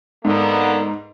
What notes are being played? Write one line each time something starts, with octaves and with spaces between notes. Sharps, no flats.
G#2 D3 A#3 B3